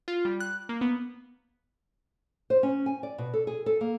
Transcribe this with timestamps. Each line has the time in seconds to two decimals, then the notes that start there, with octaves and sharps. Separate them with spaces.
0.08 F4
0.25 G3
0.40 F#6
0.69 A#3
0.81 B3
2.50 C5
2.63 C#4
2.86 G#5
3.03 D5
3.18 B2
3.34 A4
3.47 G#4
3.66 A4
3.81 A#3